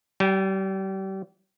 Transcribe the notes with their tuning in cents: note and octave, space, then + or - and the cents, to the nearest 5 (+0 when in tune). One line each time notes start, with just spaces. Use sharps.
G3 -35 G5 +15